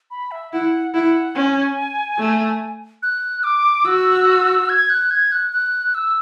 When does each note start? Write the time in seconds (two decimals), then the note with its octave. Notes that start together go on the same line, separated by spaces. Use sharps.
0.11 B5
0.31 E5
0.52 E4 F#5
0.94 E4 F#5
1.36 C#4 G#5
2.19 A3
3.03 F#6
3.44 D6
3.85 F#4 E6
4.69 G#6
4.90 F#6
5.11 G#6
5.32 F#6
5.52 F#6
5.94 E6